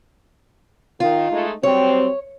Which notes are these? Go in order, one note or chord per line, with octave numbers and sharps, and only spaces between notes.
D#3 F4
G#3 A3 D#4
F#3 G3 C4 C#5